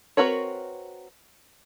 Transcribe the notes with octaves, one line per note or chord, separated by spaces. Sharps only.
C4 F#4 A#4 B4 C#5